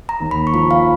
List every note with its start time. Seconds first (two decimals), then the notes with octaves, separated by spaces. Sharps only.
0.09 A#5
0.20 D#2
0.31 B5
0.47 C#6
0.54 F3 B5
0.71 F5